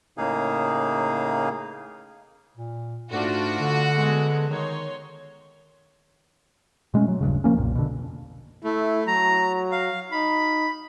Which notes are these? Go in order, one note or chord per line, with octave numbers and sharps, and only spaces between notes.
A2 C#3 A#3 D#4 G#4 F5
A#2
G#2 A3 D4 F4 F#4
D3
G#3 B3
D#3 D#4 C#5 C6
B2 G#3 A3 C#4
F#3
D#1 G2 C#3
F3 A#3 C#4
B1 F2 A#2
B2 D3
A3 E4
F#3 A#5
F5
D#4 B5